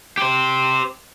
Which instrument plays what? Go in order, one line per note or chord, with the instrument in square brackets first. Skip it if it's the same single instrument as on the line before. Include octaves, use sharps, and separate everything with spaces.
[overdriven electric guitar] G4 C5